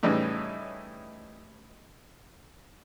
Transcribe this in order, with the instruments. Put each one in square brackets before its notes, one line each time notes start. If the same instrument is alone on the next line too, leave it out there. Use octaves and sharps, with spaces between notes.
[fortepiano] A2 C#3 E3 G3 C#4 D#4